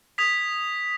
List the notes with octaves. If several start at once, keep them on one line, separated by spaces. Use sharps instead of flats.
D#6 G#6 B6 F7